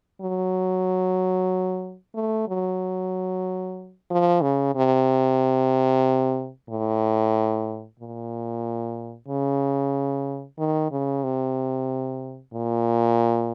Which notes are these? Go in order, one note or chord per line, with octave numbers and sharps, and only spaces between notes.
F#3
A3
F#3
F3
C#3
C3
A2
A#2
C#3
D#3
C#3
C3
A#2